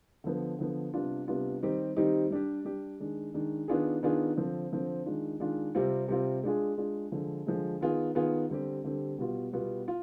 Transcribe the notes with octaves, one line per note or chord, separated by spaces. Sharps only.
D3 F3 B3
D3 F3 B3
C3 G3 B3 D4 F4
C3 G3 B3 D4 F4
D#3 G3 C4 D#4 G4
D#3 G3 C4 D#4 G4
G3 D4 G4
G3 D4 G4
D#3 G#3 D4
D#3 G#3 D4
D#3 B3 D4 F4 G#4
D#3 B3 D4 F4 G#4
D3 F3 C4
D3 F3 C4
D#3 G#3 D4 F4
D#3 G#3 D4 F4
C3 G3 C4 F4
C3 G3 C4 F4
G#3 D4 F4 G#4
G#3 D4 F4 G#4
D3 F3 G#3
D3 F3 G#3
D#3 B3 F4 G#4
D#3 B3 F4 G#4
D3 G3 C4 G4
D3 G3 C4 G4
B2 G3 B3 F4
B2 G3 B3 F4
F4